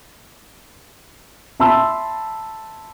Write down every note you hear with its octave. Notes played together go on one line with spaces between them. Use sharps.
E5 A5 B5 C6 E6